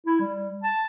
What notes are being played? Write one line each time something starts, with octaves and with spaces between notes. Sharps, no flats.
E4
G3
A5